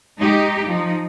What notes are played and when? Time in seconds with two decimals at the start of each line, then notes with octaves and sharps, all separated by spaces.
0.19 G#3 D#4 G4
0.66 F3 D#4